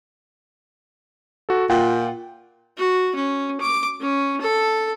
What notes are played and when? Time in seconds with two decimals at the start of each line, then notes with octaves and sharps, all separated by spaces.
1.49 F#4 A4
1.70 A#2 F4 F#5 G5
2.78 F#4
3.16 C#4
3.61 D6
4.01 C#4
4.41 A4